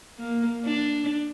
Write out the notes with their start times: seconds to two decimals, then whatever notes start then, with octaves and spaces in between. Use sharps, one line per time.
0.19 A#3
0.65 D4